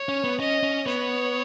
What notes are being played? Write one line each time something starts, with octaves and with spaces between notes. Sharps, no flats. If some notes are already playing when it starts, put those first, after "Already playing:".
Already playing: C#5
C#4
B3
C#4 D#5
C#4
B3 C#5